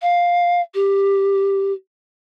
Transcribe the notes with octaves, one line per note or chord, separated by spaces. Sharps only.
F5
G4